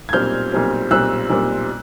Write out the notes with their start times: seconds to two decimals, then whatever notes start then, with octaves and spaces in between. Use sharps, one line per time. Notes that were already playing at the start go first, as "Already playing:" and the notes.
0.09 G#6
0.13 B1 A#2 G3 C4 F6 G6
0.52 B1 A#2 G3 C4
0.91 B1 A#2 G3 C4 E6 F#6
1.30 B1 A#2 G3 C4